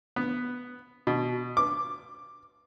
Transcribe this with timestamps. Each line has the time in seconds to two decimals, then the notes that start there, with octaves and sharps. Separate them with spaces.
0.16 B3
1.07 B2
1.57 D6